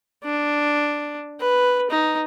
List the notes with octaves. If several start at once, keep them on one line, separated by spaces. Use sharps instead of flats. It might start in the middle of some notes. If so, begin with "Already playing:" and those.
D4
B4
D#4